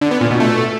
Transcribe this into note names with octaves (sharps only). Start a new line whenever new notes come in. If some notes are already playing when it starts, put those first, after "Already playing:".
D3
B3
A#2
B2
A3